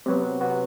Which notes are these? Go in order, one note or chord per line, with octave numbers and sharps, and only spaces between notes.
C3 F#3 B3 F#4
C3 F#3 B3 F#4